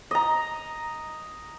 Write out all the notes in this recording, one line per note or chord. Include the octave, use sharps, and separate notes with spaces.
D#5 A#5